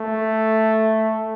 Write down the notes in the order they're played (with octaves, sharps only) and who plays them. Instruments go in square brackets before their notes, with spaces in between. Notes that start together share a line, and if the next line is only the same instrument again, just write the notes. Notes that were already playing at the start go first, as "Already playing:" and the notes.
Already playing: [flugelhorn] A3